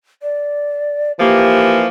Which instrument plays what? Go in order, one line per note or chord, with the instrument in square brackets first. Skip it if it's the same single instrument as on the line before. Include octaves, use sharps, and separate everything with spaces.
[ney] D5
[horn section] E3 F3 A#3 [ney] G4